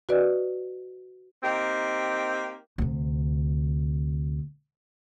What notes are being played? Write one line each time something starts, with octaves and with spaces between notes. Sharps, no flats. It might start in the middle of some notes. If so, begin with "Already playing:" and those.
F#4 B4 D5 D#5
A#3 C4 D#4 G4
D2 C3